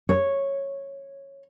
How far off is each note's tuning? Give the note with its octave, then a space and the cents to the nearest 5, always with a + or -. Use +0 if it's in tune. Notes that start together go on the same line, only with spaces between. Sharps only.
C#5 -10